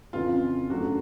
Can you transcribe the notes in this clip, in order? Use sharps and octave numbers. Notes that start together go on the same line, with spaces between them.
F2 C#3 E3 F4
F#2 C#3 F#3 A3 D4 F#4